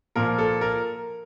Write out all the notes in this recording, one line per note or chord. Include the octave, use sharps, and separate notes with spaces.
A#2 F3 A#4
A4
A#4